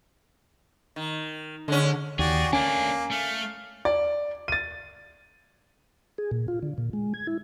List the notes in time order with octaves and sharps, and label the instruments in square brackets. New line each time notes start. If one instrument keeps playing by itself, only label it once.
[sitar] D#3
[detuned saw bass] D3 [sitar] G#3 C#4
[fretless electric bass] D#2 [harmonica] F#4 D5 G5 [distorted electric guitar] G#4
[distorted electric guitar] A3 D4 [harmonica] A#3 [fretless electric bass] C#4 [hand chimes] G#5
[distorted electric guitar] A3 [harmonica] F5
[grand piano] D5
A6 D#7
[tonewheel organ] G#4
A#2
F4
D3
A#2
G#3
G#6
E4